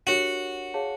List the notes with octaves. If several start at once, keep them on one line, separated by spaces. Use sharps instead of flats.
D4 F#4 G4 A#4 C#5
G#4 C#5 F5 A5